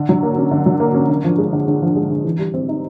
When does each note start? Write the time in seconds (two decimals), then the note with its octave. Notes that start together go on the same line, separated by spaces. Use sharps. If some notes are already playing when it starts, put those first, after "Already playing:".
Already playing: D3
0.09 F#3
0.23 A#3
0.38 C#4
0.51 D3
0.66 F#3
0.80 A#3
0.94 C#4
1.10 D3
1.24 F3
1.38 G#3
1.53 D3
1.68 D3
1.82 F3
1.96 G#3
2.10 D3
2.24 E3
2.39 G3
2.54 C4
2.69 D#4